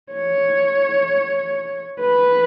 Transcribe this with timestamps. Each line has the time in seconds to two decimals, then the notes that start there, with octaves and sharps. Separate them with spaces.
0.12 C#5
2.00 B4